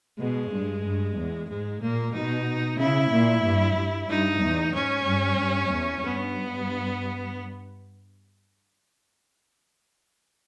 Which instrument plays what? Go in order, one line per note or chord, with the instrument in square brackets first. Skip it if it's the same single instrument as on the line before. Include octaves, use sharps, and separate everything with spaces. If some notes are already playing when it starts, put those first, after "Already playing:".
[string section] B2 [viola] G#3
[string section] G2
G2
E2
[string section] G#2 [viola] G#3
[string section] A#2 [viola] A#3
[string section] B2 [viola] D#4
[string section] C#3 [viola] E4
[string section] A#2
G2
G2
[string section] G2 [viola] D#4
[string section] E2
[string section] G#2 [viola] C#4
[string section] G2
G2
E2
[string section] G2 [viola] B3